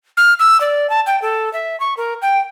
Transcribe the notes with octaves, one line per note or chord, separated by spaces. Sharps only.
F6
E6
D5
A5
G5
A4
E5
C#6
A#4
G5